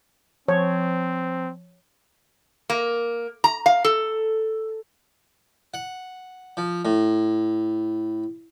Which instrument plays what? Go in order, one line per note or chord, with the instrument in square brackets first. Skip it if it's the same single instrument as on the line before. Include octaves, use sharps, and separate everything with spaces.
[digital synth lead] F3 [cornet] C4 [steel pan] C#5
[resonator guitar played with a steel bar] A#3
A#5
F5
A4
[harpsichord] F#5
F3
A2